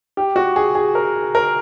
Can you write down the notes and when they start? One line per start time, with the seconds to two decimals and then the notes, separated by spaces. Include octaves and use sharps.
0.17 G4
0.36 F#4
0.56 G#4
0.75 G#4
0.95 A#4
1.35 A#4